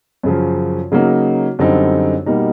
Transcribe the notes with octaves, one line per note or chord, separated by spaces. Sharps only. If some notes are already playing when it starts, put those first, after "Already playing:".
F#2 C#3 F3
C#3 F#3 A#3 D#4
F#2 D3 G3 C4 D#4
B2 G3 A#3 D#4